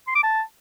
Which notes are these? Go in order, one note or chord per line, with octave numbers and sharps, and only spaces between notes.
C6
D6
A5